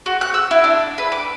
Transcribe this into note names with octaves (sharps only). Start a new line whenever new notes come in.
F#4
F#6
E6
E4
D4
B4
D6